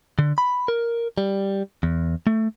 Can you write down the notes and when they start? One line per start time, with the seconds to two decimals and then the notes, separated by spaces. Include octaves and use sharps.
0.19 D3
0.38 B5
0.68 A#4
1.18 G3
1.83 E2
2.27 A3